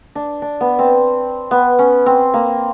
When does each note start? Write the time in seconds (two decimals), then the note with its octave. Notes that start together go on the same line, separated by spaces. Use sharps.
0.15 D4
0.42 D4
0.61 B3
0.79 C4
1.51 B3
1.79 C#4
2.06 C4
2.34 A#3